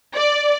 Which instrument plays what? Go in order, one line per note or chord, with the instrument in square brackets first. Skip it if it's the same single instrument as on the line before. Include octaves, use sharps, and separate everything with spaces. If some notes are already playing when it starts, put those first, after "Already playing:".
[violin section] D5